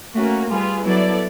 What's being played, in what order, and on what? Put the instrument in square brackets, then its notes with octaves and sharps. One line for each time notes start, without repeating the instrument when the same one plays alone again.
[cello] A3 [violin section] A#3 C#4 F#4
[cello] G3 [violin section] F4 G#4 B4
[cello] F#3 [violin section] B3 E4 A4 D5